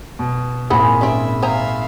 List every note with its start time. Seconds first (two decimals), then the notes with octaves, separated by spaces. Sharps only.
0.19 B2
0.70 G#1 A#2 E4 G#4 C5 F#5 B5
1.01 C4 C#4 E5
1.42 C5 E5 F5 G#5 A#5